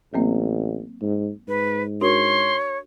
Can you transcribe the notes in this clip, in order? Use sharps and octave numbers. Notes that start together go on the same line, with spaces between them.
A1 F#3 A#3 C4
G#2
G#2 B4
D4 F#4 A#4 C#5 C6